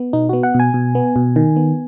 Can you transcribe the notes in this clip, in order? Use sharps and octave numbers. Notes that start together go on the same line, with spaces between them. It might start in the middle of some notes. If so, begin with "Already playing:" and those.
Already playing: B3
B2 D#4
B3 F#4
F#5
B2
G#5
B2
B3
B2
D#3
B3